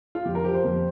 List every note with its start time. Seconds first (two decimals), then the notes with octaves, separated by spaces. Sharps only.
0.15 F4
0.25 F2 G4
0.35 A#4
0.44 F3 G4
0.54 C5
0.64 F2